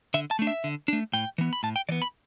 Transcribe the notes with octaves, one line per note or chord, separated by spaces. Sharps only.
D3 E5
A5
A3 D4
E5
D3
A3 D4
A2 G5
E3 B3
B5
A2 A5
G5
E3 B3 D5
B5